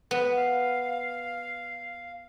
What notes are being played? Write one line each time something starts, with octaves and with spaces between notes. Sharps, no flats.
B3 B4
F5